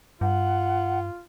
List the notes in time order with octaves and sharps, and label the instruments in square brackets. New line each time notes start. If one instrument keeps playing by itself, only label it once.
[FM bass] G2 [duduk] F4 [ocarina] F#5